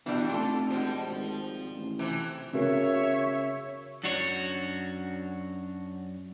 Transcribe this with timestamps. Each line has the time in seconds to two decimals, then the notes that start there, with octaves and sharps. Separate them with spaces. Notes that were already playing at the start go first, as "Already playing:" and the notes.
0.06 G2 B2 E3 G3 D4 F#4
0.29 F1 D4 F4 A4
0.71 B2 F3 G3 G#3
1.09 G#1 F3
1.77 A1
1.99 C3 E3 F3
2.53 C#3 F#4 A#4 C#5 E5
4.03 F#2 D4 F#4 C#5